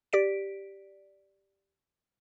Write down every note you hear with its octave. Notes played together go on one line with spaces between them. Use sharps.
G4 D5 B6 D7